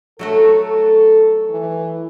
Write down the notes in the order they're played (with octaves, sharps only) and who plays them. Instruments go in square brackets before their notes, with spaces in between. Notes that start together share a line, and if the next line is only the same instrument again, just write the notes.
[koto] F#3 A3 F#4 [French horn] A4
[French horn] E3